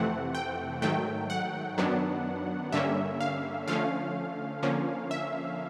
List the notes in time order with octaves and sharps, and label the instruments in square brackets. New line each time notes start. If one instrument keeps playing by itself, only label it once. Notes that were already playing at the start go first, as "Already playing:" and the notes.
Already playing: [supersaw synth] F2 C3 E3 A3 C4 F#5
G5
G#2 D#3 F#3 A3 G5
F#5
F#2 D#3 F#3 B3 D4
G2 D3 G3 A#3 C#4 E5
F5
D3 F3 A3 C#4 F5
D3 F3 A#3 C#4
E5